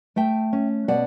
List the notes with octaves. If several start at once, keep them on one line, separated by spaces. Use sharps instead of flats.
A3 E5 G5
C#4
B2 D5 F#5